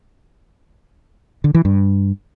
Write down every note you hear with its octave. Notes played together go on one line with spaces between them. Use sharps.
D3
E3
G2